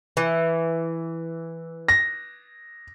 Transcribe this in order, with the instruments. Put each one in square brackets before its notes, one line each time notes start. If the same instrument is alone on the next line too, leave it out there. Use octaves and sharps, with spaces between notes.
[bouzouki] E3
[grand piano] A#6